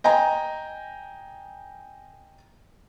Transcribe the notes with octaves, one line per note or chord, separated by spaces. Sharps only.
D#5 G5 G#5 A#5